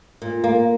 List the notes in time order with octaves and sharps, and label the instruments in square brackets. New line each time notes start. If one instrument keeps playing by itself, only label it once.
[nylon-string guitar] A#2
A#3